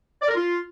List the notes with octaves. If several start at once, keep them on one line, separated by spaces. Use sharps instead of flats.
D5
A#4
F4